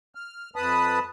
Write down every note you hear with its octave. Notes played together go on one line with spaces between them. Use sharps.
F6
F2 B4 A5 B5 D#6